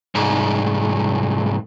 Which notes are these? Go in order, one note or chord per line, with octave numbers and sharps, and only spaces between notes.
C2 G#2